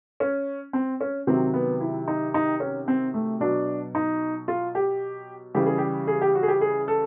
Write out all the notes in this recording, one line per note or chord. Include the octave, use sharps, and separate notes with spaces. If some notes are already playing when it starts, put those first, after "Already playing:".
C#4
C4
C#4
C3 D#3 F#3 C4
B3
E4
D#4
D#4
C#4
C4
A3
B2 F#3 D4
D#4
F4
G4
C#3 E3 G3 G4
G#4
G4
G#4
G4
F#4
G#4
G4
G#4
A4